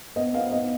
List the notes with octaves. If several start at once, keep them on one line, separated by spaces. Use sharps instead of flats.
B3 D#5
B3 F5
B3 D#5